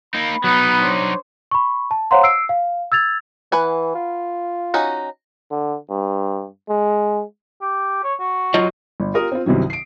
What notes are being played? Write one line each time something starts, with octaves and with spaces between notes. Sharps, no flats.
A#3 D#4 B5
F#3 B3 D#4
D4 C5 C#5
B5 C#6
A5
C5 C#5 F5 F#5 A#5 C6
E6 C7 D7
F5
E6 G#6 A6 F7
E3 B4 F#5 G#5
F4
C#4 D#4 F#4
D3
G2
G#3
G4
C#5
F#4
F#3 F4 D#5
G1
F4 G4 A#4 D#6
C4 F4
C2 G2 C3 D#3 F#3
C7 D7